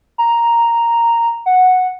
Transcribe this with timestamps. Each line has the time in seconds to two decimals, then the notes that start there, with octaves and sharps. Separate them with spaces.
0.18 A#5
1.46 F#5